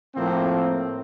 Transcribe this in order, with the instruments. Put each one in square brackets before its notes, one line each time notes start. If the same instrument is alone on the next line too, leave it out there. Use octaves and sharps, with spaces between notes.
[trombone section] A2 F3 A#3 C4